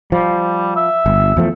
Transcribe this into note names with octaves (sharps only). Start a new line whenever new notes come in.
F3 G3
E5
G1
E2 F3 A3